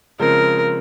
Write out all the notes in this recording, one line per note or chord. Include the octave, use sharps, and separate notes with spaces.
C#3 F3 G#3 C4 A#4